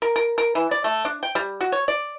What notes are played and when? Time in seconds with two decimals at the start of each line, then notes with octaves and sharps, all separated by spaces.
0.02 A#4
0.16 A#4
0.38 A#4
0.55 E3
0.71 D5
0.84 A3
1.05 D4
1.23 G5
1.35 G3
1.61 F#4
1.72 C#5
1.88 D5